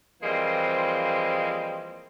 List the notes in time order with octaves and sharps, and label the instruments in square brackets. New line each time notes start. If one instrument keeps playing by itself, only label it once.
[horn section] E3 F3 G3 G#3 A#3 C4